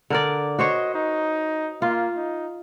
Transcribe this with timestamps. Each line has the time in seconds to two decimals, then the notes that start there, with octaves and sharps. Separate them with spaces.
0.10 D3 A#4 D5
0.59 F#4 C5 C#5 D#5
0.95 D#4
1.82 A#3 F4
2.17 D#4